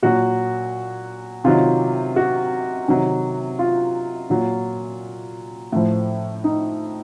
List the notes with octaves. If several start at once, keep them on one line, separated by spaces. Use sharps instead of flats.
A#2 F#3 F#4
C3 D#3 F#3 F4
F#4
C3 D#3 F#3
F4
A#2 F#3
A2 F3
D#4